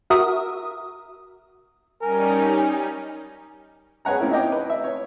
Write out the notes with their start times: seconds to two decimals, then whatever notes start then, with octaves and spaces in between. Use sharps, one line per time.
0.10 F#4 A#4 E5 D#6
2.02 G3 C#4 D#4 A#4 G#5
4.05 G#4 B4 C#5 F#5 A#5
4.19 A#3 C4 C#4 E4 A#4
4.31 D#4 E4 C#5 D#5 G5 D6
4.52 B4
4.70 E5
4.84 C#5